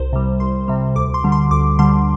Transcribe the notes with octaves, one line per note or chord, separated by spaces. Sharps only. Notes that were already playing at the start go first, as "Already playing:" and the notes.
Already playing: C2 C5
C3 G3
C2 C6
C3 G3
D2 D6
C6
D3 G3
C6
D2 D6
D3 G3 C6